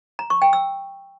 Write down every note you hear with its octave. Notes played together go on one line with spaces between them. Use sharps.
A#5
C#6
G5
E6